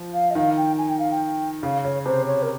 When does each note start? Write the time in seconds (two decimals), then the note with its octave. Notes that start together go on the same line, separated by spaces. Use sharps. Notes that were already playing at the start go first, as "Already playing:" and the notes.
Already playing: F3
0.14 F5
0.31 D#5
0.35 D#3 F5
0.57 G5
0.78 G#5
0.89 G5
0.99 F5
1.11 G5
1.63 C#3 F5
1.84 C#3 C#5
2.06 C3 C5
2.27 C#5
2.42 A#4